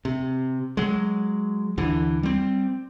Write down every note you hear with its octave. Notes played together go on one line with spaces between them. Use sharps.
C3
F#3 G#3
D2 D3 E3
G3 C4